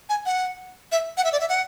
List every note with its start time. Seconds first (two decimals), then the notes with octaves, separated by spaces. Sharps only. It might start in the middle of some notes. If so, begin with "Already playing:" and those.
0.09 G#5
0.26 F#5
0.92 E5
1.17 F#5
1.24 E5
1.33 D5
1.41 E5
1.49 F#5